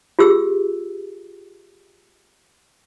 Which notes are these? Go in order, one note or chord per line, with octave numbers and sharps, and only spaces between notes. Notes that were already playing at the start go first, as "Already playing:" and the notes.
F4 G4 G#4 E6